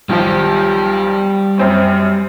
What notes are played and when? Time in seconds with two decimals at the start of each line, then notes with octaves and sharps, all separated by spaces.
0.09 B1 D#3 F3 G3 G4
1.58 F#2 C4 C#4